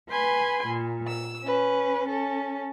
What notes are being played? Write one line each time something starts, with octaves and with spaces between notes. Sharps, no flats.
B4 G#5 B5 C6
A#2
E6
C#4 B4
C#4 A4